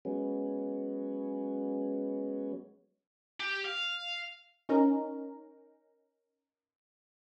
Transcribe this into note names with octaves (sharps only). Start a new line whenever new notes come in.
F#3 G#3 B3 C#4
G4
F5
C#4 D#4 A#4